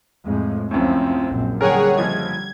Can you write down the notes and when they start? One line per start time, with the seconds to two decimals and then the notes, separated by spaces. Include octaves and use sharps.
0.24 F2 A2 G#3
0.71 C#2 F#2 A2 F3 C4
1.28 A#1 F#2
1.61 D3 G3 G#4 A#4 C#5 F#5 G5
1.97 F#1 F3 D#5 G#6